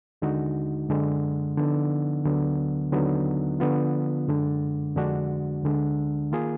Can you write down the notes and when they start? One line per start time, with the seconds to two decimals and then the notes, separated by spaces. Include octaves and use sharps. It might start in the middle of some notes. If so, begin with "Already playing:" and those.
0.22 D#2 D3 G#3 D#4 F#4
0.89 F#2 D3 G#3
1.57 D3 F3 B3 D#4
2.25 D2 D3 F#3 B3
2.92 D#2 D3 F#3 B3 D#4
3.60 D3 F3 B3 F4
4.28 F#2 D3 G#3 D4
4.96 F2 D3 G#3 D4 F#4
5.63 D2 D3 G#3 D4
6.32 D#3 A#3 F4 G#4